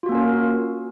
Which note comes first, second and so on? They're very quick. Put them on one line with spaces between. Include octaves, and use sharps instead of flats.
F4 F#4 A#3 C#4 A#4